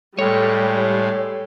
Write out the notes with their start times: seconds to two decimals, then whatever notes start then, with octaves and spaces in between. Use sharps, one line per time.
0.19 A2 G3 G#3 A4 C#5 G5 F6